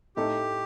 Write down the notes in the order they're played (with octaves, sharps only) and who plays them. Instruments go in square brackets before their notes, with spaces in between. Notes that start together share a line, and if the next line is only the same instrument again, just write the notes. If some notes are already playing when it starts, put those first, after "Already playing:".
[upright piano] A2 A3 D#4 A4 [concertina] G4